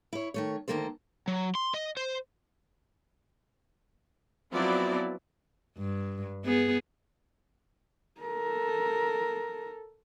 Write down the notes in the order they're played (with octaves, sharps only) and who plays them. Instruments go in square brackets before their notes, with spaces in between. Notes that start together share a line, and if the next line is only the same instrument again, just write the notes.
[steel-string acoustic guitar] E4 C#5
D#3 A3 C#5
D2 G#2 D#3 A#3 A4 C5
[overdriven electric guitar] F#3
C6
D#5
C5
[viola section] F3 F#3 B3 C4 E4 D5
[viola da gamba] G2
B3 G#4
[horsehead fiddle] A4 A#4